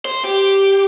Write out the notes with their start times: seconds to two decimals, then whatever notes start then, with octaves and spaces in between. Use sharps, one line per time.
0.05 C5
0.24 G4